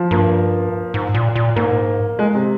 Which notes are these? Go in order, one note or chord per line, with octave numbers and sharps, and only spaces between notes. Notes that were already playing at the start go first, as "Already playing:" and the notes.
Already playing: F3
G2 A#3
G#2
A#2
A#2
G#2 A#3
G#3
C3